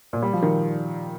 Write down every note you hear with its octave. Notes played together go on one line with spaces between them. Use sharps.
A#2
G3
F3
D#3